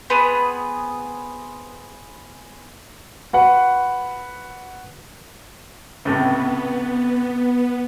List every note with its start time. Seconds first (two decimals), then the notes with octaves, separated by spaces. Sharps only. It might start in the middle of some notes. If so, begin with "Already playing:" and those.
0.10 B3 C4 G#4 B4
3.33 F#4 B4 F#5
6.05 C#2 A2 C3 B3